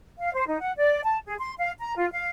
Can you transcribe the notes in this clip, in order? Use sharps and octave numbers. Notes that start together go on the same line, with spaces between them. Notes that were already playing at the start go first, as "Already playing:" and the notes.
F5
C5
D#4
F#5
D5
A5
G#4
C6
F5
A#5
F4
F5